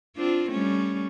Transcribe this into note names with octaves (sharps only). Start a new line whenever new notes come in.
C4 D4 F4
G3 A3 C#4